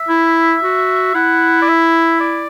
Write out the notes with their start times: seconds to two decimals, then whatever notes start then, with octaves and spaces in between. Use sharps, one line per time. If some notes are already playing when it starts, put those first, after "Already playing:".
Already playing: E5
0.09 E4
0.62 F#4
1.15 E4 F#5
1.62 D5
1.68 E5
2.20 D5